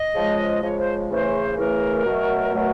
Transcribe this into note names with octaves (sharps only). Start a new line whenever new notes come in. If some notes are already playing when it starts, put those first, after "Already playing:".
Already playing: D#5
C#3 F3 G#3
C#3 F3 G#3 C#5
C5
C#3 E3 A3 C5
C#3 E3 A3 A#4
B2 F#3 A3
B2 F#3 A3